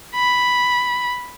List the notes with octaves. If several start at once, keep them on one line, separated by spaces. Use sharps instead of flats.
B5